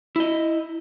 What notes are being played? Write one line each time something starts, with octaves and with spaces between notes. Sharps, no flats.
E4 D#5